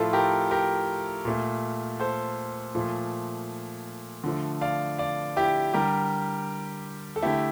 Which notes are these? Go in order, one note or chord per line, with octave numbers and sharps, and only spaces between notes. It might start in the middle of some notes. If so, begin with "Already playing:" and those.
Already playing: A2 F3 A3 F4 A4
G4 A#4
G4 A#4
A#2 A3
A4 C5
A#2 F3 A3
D3 F3 A3
D5 F5
D5 F5
E4 G4
D3 G3 G4 A#4
A4
D3 A3 E4 G4